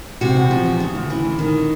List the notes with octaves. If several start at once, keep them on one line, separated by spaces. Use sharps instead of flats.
C3 F#4
E2
F3
E2
C#3
D2
E3
D2
D#3